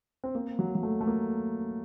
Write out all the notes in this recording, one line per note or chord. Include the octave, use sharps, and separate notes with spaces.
C4
A#3
F#3
F#3
A3
A3
A#3